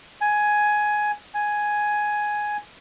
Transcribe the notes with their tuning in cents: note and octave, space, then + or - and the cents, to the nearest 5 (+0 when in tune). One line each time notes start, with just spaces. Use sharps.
G#5 +10
G#5 +5